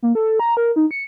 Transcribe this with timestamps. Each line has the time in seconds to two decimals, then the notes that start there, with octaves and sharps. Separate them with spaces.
0.02 A#3
0.15 A4
0.39 A#5
0.57 A#4
0.76 D#4
0.91 C#7